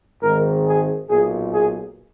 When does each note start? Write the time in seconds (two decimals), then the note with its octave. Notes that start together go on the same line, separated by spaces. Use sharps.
0.22 G#1 G#2 D#3 A#4
0.65 G#4
1.08 B1 A#2 G#4
1.52 G#4